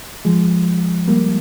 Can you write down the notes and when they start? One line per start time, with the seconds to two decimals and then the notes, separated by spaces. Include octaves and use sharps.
0.25 F3 G#3
1.08 G3 A#3